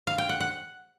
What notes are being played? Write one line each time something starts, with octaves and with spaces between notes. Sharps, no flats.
F5
G5
F#5
F#5